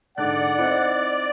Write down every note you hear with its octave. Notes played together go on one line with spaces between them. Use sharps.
G#2 D3 D5 F#5 F#6
C4 D#4 E4